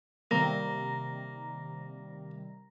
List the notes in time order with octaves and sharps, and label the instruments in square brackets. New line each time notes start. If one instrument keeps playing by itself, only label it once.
[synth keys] C3 D#3 G3 [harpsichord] A#3 [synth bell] A#5 A#6